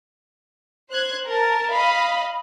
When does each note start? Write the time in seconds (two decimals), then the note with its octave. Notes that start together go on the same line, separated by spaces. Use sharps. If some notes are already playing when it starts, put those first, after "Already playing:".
0.90 C5 F#6 G#6
1.26 A#4 A5
1.72 D#5 F5 B5